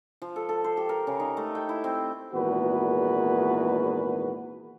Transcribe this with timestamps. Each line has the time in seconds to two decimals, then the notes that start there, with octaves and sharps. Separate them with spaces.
0.22 F3
0.36 A4
0.49 A4
0.64 C5
0.77 G4
0.89 A#4
1.07 C#3
1.20 D#4
1.37 A3
1.55 G5
1.69 E4
1.84 C4
2.33 G#1 E2 A#2 F#4 A#4 B4